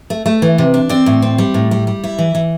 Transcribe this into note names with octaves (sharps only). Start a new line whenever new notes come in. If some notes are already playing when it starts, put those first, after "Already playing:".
A3
A3
E3
C3
D4
C4 D5
A2
C4
G3
A2
G3
G3
E4
E3
E3